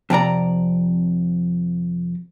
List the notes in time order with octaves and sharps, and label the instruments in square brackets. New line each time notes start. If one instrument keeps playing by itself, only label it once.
[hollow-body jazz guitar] F2 C3 D5 A#5